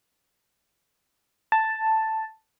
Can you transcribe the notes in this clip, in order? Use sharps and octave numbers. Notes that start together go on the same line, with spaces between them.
A5